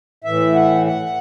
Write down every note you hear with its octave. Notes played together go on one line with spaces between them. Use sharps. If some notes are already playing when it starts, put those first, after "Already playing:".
A2 E3 E5
F#5
F#5